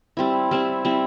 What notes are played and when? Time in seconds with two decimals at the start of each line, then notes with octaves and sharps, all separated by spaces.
0.17 G3 C4 E4
0.51 G3 C4 E4
0.85 G3 C4 E4